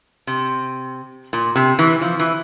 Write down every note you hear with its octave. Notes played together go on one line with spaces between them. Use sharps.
C3
A#2
C3
E3
F3
E3